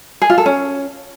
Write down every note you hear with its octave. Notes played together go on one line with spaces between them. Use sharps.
G#4
F4
A4
C#4